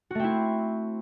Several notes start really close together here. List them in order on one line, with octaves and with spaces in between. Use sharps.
F#4 A3 C4 E4